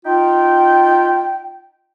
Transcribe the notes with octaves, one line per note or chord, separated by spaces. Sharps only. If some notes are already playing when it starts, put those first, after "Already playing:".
D#4 F4 G5